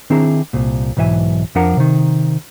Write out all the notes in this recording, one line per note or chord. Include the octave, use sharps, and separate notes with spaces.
D#3 C4 D4 E4 G#4 A#5
C2 A#2
B1 G#2 E3 E5 G#5
F2 F3 D4 A#4 F#5 A#5
C3 D#3